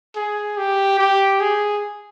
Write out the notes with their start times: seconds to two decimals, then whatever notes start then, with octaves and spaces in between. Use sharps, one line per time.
0.16 G#4
0.57 G4
0.99 G4
1.40 G#4